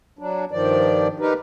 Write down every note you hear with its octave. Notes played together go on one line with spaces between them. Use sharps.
F#3 D4
G2 D#3 F3 D5
D#4 G4 A#4 B4